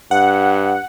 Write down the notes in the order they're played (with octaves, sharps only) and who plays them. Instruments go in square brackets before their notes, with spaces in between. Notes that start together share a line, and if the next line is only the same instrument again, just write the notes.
[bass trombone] G2 [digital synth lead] F#5